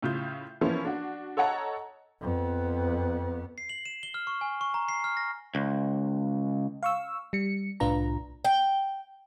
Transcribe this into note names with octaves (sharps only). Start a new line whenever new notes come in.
A2 C#3 F4 G6
E3 F3 A#3 B3 C#4 E4
D4 F#4
A4 C#5 D#5 F#5 A5 A#5
F2 B3
C7
F#7
E7
G7
F6
C#6
G#5
C#6
A#5
C7
F6
A#6
C#2
F5 C#6 E6
G3 C#7
C2 A2 D4 F4 B4 A#5
G5